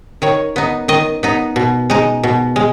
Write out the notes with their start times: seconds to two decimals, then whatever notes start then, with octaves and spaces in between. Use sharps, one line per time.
0.22 D#3 C#5
0.56 B3 D#4
0.88 D#3 D#5
1.23 B3 D#4
1.56 B2
1.90 G#3 D#4
2.23 B2
2.56 G#3